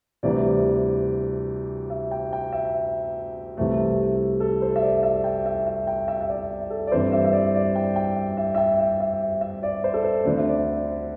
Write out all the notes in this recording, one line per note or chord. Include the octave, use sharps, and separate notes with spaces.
D2 C3 E3 G3 D5
E5
G5
G5
E5
C2 C3 E3 A3
A4
C5
E5
D5
E5
G5
E5
E5
G5
E5
E5
D5
A4
D5
G2 E3 C4 C5
E5
E5
D5
D5
G5
G5
E5
E5
E5
G5
E5
E5
E5
D5
C5
A4
C5
D2 D3 C4 D5
E5
D5